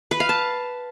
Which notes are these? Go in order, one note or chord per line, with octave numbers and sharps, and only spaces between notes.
B4
F5
A5